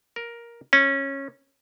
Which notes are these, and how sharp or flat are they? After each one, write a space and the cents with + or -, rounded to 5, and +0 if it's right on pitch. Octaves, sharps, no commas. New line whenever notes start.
A#4 +10
C#4 -15